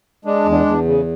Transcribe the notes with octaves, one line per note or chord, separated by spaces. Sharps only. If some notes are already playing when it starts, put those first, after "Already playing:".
G#3 D4
E2
D4
E2
C#3